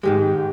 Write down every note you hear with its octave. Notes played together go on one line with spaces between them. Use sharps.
G#2 D#3 G#3 G4